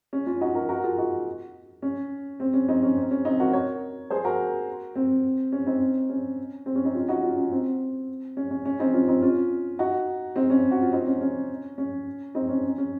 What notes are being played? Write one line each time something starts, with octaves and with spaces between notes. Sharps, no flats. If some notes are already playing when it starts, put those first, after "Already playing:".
C#4
C#4 F4
D#4 F#4
F#4 A#4
F#4 A#4
F4 G#4
D#4 F#4
C#4
C4
C#4
C4 D#4
C#4
C4
C#4
C4 D#4
F#4 A#4
A#4 C#5
G#4 C5
F#4 A#4
C4
C#4
C4 D#4
C#4
C4
C#4
C4 D#4
C#4 F4
D#4 F#4
C#4 F4
C#4
C4
C#4
C#4
C#4
C4 D#4
C#4 F4
C4 D#4
C#4 F4
D#4 F#4
C4 D#4
C#4
F#4
F4
C4 D#4
C#4
C#4
C#4
C4 D#4
C#4
C#4
C#4